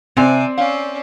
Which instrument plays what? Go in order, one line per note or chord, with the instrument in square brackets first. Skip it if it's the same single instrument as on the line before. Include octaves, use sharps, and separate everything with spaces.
[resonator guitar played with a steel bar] C3 G#5 [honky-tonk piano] C4 [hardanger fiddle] D5
[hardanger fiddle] C#4 D5 [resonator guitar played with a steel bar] F5